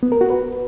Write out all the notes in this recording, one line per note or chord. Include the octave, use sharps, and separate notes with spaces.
B3
A#4
F#4
B4